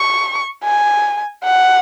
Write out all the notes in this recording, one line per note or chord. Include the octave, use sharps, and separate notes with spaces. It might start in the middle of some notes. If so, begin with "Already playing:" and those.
Already playing: C#6
G#5
F#5